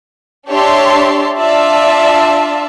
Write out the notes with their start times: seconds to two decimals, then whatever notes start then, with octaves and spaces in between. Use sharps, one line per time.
0.48 D4 G4 C#5 E5 A5 C6
1.38 D4 F4 D5 E5 A5